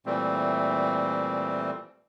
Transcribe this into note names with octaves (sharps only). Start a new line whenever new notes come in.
A#2 E3 G3 A3 C4